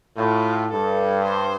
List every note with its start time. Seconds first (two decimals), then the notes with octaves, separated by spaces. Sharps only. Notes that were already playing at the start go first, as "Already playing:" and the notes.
0.17 A2 F4
0.71 G2 A4
1.25 C5